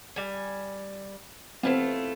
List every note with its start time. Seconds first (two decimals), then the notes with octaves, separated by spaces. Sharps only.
0.16 G3 G#5
1.63 A3 B3 C4 E4 F4